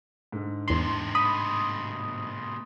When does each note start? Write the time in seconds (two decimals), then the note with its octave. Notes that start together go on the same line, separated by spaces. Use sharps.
0.32 G#2 D3
0.68 E2 A2 C3 C6
1.15 B5 D#6